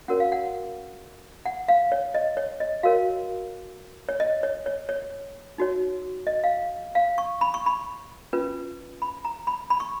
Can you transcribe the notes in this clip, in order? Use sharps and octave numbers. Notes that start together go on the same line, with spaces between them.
C#4 F#4 A#4 C#5 F#5
F5
F#5
F#5
F5
C#5
D#5
C#5
D#5
F#4 A#4 C#5 F5
C#5
D#5
C#5
C#5
C#5
D#4 F#4 C#5
D#5
F5
F5
C#6
B5
C#6
B5
C#4 F4 B4
B5
A#5
B5
B5
C#6